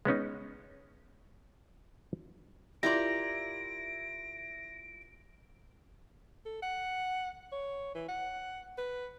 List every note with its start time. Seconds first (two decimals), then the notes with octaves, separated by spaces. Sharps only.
0.05 G#3 B3 C#4 D#4
2.83 E4 F4 G4 A#4 D5 A#6 D7
6.46 A4
6.62 F#5
7.52 C#5
7.95 E3
8.09 F#5
8.78 B4